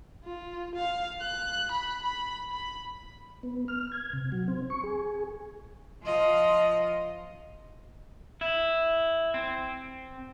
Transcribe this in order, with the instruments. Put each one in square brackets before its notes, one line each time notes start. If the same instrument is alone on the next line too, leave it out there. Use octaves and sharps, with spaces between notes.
[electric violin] F4
F5
F#6
B5
B5
B5
[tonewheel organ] B3
F6
G#6
C3
F#3
C4
C#6
G#4
[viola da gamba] F3 F4 D#5
[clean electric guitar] E4
C4